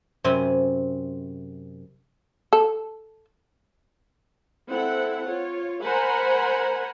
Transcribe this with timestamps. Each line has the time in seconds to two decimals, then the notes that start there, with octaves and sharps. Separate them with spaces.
0.24 F#2 C3 C4 G#5 B5
2.53 A4
4.68 C4 E4 A4 F#5
5.26 F4 C#5
5.82 A#4 C5 F#5 G#5 A#5 B5